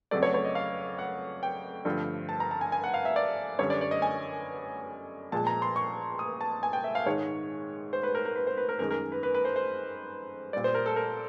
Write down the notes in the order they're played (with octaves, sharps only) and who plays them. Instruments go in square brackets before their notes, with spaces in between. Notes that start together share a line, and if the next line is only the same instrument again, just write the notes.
[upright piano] F2 C#3 F#3 A3 D5
C#5
C#5
D#5
F5
F#5
G5
G2 D3 F3 A3
A5
A#5
A5
G#5
G#5
F#5
F5
E5
D5
F#2 D3 G3 C#5
D5
D5
D#5
G#5
A#2 F3 G#3 A5
A#5
C6
C#6
D#6
A5
G#5
G5
E5
F5
G#2 D#3 G#3 C#5
C5
B4
A#4
A#4
B4
C5
B4
A#4
F#2 D#3 G#3 A#4
A#4
B4
B4
B4
C5
C5
A#2 G3 D5
C5
A#4
A4
A#4